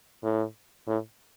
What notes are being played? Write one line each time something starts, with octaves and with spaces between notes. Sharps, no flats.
A2
A2